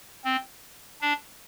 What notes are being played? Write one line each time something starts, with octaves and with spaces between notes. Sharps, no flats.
C4
D4